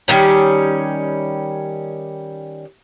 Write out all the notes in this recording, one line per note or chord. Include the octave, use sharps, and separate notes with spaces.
D#3 G3 C#4